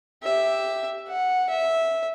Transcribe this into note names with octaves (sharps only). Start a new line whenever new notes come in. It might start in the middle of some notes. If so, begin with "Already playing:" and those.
G4 E5
F#5
E5